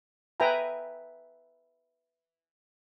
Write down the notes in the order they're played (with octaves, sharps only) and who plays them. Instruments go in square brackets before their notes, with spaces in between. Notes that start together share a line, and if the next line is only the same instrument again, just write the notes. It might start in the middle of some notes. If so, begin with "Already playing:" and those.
[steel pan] B4 E5 G5 G#5 A#5